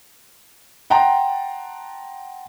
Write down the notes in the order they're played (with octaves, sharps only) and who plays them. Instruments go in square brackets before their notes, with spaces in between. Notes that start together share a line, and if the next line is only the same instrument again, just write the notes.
[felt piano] F#5 G5 A5 A#5 C6